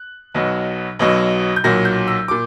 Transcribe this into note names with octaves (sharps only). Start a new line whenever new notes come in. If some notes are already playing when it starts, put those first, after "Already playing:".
Already playing: F#6
B1 B2 F#3
B1 B2 F#3
G6
B1 A#2 F#3 A#6
G6
E6
A#2 D6